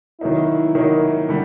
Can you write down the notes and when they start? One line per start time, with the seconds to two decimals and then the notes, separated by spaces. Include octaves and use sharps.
0.21 D#3 F#3 A#3 D#4 E4
0.75 D#3 F#3 A#3 D#4
1.29 D3 G3